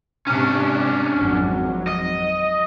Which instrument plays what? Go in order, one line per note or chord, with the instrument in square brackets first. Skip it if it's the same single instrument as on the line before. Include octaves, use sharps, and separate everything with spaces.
[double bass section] G#2 C3 [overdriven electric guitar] C#4 D4
[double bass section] G#1 F2 F#3
[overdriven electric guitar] D#5